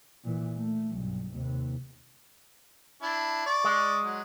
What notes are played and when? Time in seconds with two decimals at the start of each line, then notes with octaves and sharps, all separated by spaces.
0.24 A#2 E3
0.57 A3
0.91 B1 G2
1.33 D#2 C3
3.02 D4 E4
3.46 D5 C#6
3.64 G#3
4.04 F#3